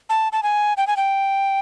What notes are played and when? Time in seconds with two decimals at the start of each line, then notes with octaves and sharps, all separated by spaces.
0.09 A5
0.32 A5
0.43 G#5
0.77 G5
0.87 G#5
0.97 G5